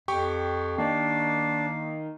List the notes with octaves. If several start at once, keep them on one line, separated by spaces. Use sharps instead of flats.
F2 G4 G5 C#6
D#3 A#3 D4